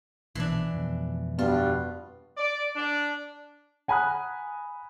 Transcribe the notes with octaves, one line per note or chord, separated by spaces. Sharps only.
A#1 B2 E3 D4
F2 B2
G2 B3 F4 F#4
D5
D4
F#5 G#5 A#5 B5 D#6 F#6